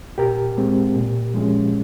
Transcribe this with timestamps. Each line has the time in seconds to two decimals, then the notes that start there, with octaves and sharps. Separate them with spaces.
0.18 A#2 G4 A#4
0.58 G#3 C4
0.96 A#2
1.34 F3 G#3 C#4